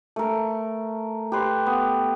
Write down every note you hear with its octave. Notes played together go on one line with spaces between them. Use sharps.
A3 A#4
G4 B4 C6
B3